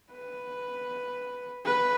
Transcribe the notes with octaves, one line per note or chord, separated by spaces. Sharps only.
B4
B4